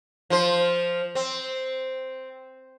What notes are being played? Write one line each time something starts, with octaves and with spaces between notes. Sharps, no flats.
F3 C5
C4